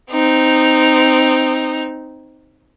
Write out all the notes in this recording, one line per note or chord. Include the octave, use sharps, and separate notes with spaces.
C4 D#4